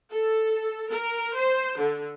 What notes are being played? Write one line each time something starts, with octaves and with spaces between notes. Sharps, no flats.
A4
A#4
C5
D3